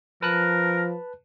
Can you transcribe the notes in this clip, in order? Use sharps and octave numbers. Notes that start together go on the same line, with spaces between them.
F3 A#4 B4 A5 F#6